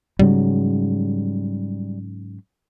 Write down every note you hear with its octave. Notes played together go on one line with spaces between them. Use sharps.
G#2 C#3 F#3 G3